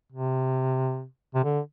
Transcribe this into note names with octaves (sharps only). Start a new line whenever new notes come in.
C3
C3
D3